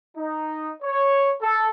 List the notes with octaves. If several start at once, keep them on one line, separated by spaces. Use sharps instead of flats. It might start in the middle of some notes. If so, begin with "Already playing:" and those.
D#4
C#5
A4